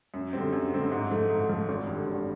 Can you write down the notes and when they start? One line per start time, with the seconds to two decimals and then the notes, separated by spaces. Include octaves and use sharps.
0.14 F#2
0.33 D3 G3 C4
0.53 F#2
0.72 D3 G3 C4
0.92 G#2
1.11 F3 A3
1.29 G#2
1.49 F3 A3
1.69 G#1
1.87 G2 D3
2.07 G#1